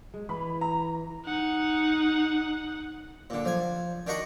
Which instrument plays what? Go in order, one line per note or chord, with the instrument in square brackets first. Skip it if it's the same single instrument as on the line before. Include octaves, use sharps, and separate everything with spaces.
[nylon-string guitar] G#3
[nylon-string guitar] E3 [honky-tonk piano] B5
[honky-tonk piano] A#5
[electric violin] D#4 F#5
[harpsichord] A#2 D3
F3 G#5
D#3 D4 D#4 F#4 F#5 A#5